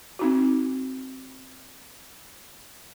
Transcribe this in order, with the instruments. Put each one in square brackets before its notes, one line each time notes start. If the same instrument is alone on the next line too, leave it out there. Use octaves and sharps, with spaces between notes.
[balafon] C4 D#4 F#4